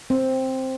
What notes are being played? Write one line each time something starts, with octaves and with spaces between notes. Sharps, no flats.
C4